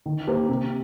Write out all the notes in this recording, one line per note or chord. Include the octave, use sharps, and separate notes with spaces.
D#3
A#3 G4 C5
C3